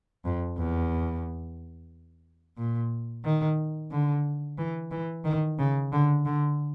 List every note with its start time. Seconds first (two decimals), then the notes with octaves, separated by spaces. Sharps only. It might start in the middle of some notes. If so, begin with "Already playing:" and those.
0.25 F2
0.58 E2
2.57 A#2
3.24 D#3
3.91 D3
4.58 E3
4.91 E3
5.24 D#3
5.59 C#3
5.92 D3
6.25 D3